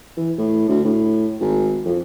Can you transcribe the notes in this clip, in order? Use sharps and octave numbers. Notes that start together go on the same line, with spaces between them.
E3
A2
D2
A2
G#1
F2